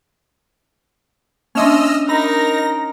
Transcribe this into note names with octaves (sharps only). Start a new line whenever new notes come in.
A#3 C#4 D4 D#5 E5 C6 E6 F6
D#4 A#4 B5 A#6